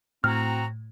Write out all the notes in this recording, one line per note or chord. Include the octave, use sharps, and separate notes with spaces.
A2 C4 F#4 A#5 F6